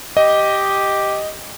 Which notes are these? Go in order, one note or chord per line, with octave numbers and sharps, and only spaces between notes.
G4 D#5